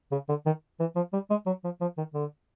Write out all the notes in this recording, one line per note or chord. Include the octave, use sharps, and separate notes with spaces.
C#3
D3
D#3
E3
F3
G3
G#3
F#3
F3
F3
D#3
D3